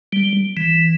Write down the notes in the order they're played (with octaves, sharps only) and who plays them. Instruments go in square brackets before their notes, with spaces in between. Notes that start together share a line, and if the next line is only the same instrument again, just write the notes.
[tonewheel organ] G3
E3